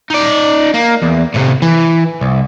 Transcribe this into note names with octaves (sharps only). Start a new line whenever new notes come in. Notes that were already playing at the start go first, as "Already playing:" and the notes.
D#4 D5
A#3
E2
A2 C3
E3
C2